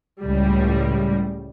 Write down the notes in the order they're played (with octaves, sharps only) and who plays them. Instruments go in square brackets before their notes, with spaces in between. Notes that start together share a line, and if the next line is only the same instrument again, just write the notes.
[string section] C#2 A2 G3